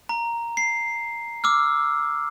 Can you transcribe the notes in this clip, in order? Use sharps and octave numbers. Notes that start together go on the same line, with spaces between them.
A#5
C7
D6 E6 F6